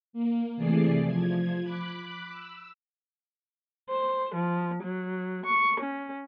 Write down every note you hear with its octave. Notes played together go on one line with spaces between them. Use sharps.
A#3
C3 E3 A3 G#4 D5 C7
F3 G#6
B5 D6 F#6
E6
C5
F3
F#3
C#6
C#4